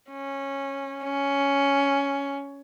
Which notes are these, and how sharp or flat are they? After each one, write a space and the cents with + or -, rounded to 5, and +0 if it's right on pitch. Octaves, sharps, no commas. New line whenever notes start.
C#4 -10
C#4 +10